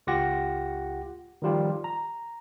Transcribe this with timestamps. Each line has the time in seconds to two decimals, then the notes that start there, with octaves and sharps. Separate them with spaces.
0.07 C#2 F4 G4 F#5 A#6
1.42 D#3 F3 G3 F4 G4
1.84 A#5